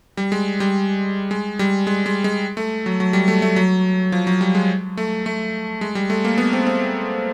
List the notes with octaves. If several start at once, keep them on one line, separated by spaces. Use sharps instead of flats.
G3
G#3
G3
G#3
G3
G#3
G#3
G#3
A3
F#3
F#3
G3
A3
A3
F#3
F3
F#3
G3
G#3
A3
A3
G#3
G3
A3
A#3
B3
C4
C4